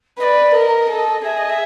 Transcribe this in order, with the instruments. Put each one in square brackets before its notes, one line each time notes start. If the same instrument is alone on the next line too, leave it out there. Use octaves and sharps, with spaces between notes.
[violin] B4 [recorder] D5 D#5
[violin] A#4 [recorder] D#5
[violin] A4
[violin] G#4 [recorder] E5
[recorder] D#5
E5